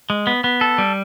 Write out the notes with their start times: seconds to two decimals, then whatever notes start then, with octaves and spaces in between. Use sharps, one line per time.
0.10 G#3
0.27 B3
0.44 B3
0.61 A4
0.78 G3